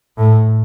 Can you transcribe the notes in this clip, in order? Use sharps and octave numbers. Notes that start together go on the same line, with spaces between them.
A2